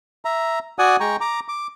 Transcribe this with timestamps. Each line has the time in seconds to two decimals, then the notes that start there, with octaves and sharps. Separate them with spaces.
0.25 E5 A#5
0.79 F#4 D5 F#5 G#5 D#6
1.00 G#3 G5 A#5 C#6
1.21 A#5 D6
1.48 D6